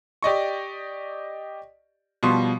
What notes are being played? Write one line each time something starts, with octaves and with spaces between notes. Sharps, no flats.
G4 D5 D#5 C#6
B2 F3 G3 C6